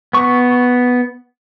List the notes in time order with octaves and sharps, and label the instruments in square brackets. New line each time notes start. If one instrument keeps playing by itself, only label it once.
[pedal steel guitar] B3 C#6